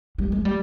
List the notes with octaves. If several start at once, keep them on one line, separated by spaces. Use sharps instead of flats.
G3
G#3
G3